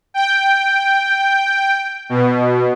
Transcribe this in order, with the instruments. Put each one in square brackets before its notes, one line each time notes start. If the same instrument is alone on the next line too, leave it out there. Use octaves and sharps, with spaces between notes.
[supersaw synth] G5
B2